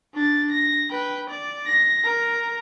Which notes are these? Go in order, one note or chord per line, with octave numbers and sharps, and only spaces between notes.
D4 A6
A#6
B4 G5
D5
A#6
A#4